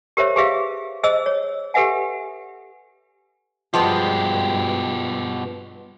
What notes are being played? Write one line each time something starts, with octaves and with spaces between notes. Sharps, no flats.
G4 A#4 C5 C#5 E5
G4 G#4 B4 E5 F5
G#4 C5 D#5 E6
C#5
G4 A4 B4 E5 F#5 G#5
G2 B2 F3 G#3 B3 G4